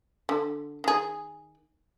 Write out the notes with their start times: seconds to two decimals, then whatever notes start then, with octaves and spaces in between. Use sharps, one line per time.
0.29 D3
0.84 D#3 G#4